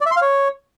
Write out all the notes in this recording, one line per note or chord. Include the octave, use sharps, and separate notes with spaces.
D5
E5
C6
F5
C#5